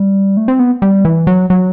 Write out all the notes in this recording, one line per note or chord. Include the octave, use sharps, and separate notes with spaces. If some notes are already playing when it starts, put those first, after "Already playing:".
Already playing: G3
A3
C4
B3
G3
E3
F#3
F#3